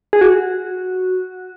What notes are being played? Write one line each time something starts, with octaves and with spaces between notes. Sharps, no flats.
G#4
F#4